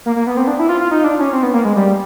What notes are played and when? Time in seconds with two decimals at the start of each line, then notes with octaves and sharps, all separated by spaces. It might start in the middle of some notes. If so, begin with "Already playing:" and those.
0.06 A#3
0.16 A#3
0.27 B3
0.37 C4
0.48 D4
0.59 E4
0.69 F4
0.80 F4
0.91 D#4
1.04 D4
1.19 C#4
1.33 C4
1.43 B3
1.54 A#3
1.65 G#3
1.76 G3